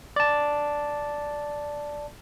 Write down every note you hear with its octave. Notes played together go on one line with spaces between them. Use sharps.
D5 A5